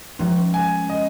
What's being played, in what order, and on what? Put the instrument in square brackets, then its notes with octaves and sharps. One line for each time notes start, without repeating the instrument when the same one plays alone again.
[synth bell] F3 G#3 C#4
[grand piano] G#5
D#5